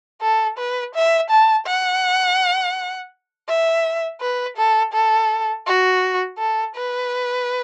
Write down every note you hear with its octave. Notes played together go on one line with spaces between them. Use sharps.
A4
B4
E5
A5
F#5
E5
B4
A4
A4
F#4
A4
B4